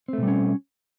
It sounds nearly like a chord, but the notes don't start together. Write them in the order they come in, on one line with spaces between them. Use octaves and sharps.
C4 A3 B2 G3 C#4